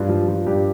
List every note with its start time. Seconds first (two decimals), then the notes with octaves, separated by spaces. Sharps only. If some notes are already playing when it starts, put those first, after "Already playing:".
Already playing: G2 F4
0.09 F3
0.28 F3
0.46 G2 G4